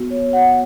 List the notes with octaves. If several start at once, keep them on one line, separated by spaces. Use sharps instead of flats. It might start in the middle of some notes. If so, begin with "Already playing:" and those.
Already playing: B3 F#4
C#5
F#5